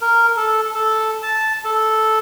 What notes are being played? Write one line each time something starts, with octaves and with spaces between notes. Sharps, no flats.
A#4
A4
A4
A5
A4